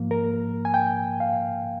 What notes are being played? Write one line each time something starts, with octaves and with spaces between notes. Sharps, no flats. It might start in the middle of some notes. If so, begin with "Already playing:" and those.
Already playing: G#2 F3 A#3
A#4
G#5
G5
F5